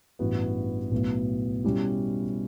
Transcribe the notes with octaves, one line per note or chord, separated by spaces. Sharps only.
A1 G2 E3 B3 F#4
B1 A2 F#3 B3
B2 G3 C#4 E4 G4